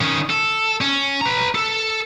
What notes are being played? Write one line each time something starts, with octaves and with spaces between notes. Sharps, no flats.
D#3 C#4
A4
C#4
B4 A#5
A4